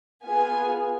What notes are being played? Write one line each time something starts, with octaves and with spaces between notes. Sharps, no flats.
B3 F4 G#4 G#5